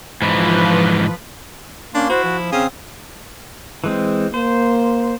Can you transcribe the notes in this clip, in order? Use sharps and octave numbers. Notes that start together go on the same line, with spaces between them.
G#2 E3 F3 B4
A#3 C#4 D4 C6
E4 F#4 C5
F3
C#3 C4 F5 G#5 D#6
E3 G#3 C4
A#3 C5